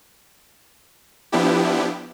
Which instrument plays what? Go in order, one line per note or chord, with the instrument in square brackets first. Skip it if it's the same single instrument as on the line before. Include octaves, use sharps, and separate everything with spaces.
[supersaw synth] F3 B3 D4 E4 G4